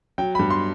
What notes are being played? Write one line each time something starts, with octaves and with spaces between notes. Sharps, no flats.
F#3 G5
G2 B5
C6